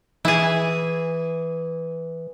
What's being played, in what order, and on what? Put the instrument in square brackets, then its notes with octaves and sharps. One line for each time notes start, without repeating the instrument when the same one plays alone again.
[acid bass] E3 [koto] E4 G#4